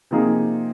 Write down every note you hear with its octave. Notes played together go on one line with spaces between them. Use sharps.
C3 F3 A#3 D#4 G#4